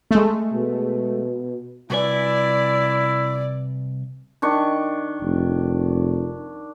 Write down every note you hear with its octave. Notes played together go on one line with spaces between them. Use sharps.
G#3 A3
B2
C2 E4 B4 D5 G#5
D#3 D4 C#6
F1